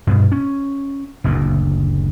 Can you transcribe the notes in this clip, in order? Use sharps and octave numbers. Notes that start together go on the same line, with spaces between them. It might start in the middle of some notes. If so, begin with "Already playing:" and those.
G2 B2
C#4
F#1 D2 A#2